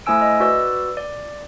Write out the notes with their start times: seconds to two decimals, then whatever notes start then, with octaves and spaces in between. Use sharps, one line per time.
0.06 A3 E4 C5 G#5 E6 D7
0.21 D#5
0.40 F#4 B4 D5 E6 F#6
0.97 D5